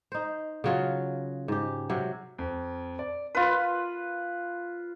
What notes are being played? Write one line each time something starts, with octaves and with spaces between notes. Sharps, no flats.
D#4 C5
C#3 F#3 F4
G#2 G4
C3 F#3
F2
D5
F4 B4